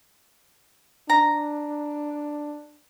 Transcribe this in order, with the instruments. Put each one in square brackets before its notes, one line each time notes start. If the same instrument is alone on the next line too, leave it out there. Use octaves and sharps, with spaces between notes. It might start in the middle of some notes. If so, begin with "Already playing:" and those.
[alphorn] D4 [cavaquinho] A#5